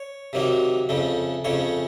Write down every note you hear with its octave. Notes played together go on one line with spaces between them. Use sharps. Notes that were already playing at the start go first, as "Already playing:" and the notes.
Already playing: C#5
C3 D#3 F#3 A#3
F2 C#3 A3
F2 C#3 A3 C#5